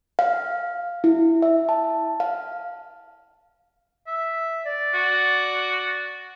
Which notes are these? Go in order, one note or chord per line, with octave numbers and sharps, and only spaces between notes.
F5
E4
E5
A5
F5
E5
D5
F#4